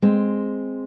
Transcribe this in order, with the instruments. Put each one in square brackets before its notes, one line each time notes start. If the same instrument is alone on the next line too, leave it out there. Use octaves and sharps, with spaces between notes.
[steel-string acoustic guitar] G#3 C4